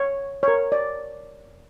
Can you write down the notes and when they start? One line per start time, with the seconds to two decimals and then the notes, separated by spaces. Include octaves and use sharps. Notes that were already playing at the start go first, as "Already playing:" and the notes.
Already playing: C#5
0.43 C#5
0.48 A#4
0.72 D5